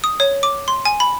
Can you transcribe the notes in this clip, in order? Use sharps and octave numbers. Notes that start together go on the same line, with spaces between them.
D#6
C#5
D6
C6
G#5
B5